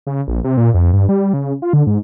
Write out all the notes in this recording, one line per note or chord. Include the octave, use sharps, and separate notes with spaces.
C#3
A#1
C3
A#2
F2
G2
G3
C#3
F4
D3
G#2